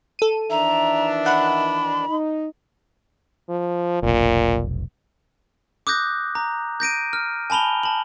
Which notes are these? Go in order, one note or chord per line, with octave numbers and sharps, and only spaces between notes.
A4 D#7
D#3 E3 D4 E5 A#5
F#5 B5
D#4
F3
F1 B1 A#2
D6 D#6 F#6 G6 A#6
A#5
G6 A#6 D7 D#7
F6
G#5 A5 B5 F7 G7
A5 F#7